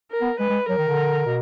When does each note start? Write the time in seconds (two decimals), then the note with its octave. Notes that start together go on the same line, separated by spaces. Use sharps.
0.11 A#4
0.21 B3
0.40 G#3 B4
0.50 G#3
0.69 F#3 A#4
0.78 D#3
0.88 D3
1.26 B2